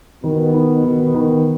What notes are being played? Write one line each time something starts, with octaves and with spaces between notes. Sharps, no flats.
B2 D#3 B3
D#4
D#3
D#3